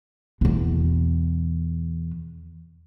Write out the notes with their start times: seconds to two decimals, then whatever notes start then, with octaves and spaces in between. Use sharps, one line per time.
0.41 E2 B2